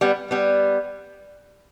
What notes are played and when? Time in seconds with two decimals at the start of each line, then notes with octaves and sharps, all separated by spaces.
0.01 G3 B3
0.31 G3 B3